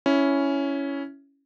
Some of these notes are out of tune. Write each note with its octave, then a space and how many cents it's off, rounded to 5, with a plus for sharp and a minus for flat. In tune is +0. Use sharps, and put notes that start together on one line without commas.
C#4 +5 E4 +0